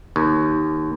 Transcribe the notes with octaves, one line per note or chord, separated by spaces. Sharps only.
D#2